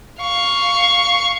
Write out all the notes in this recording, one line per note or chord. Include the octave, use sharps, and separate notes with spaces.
F5 C#6